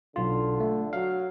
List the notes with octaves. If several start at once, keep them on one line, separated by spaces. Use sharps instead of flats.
B1 D3 F4
A3
F#3 F5